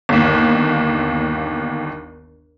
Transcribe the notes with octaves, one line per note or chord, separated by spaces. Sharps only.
G1 D#2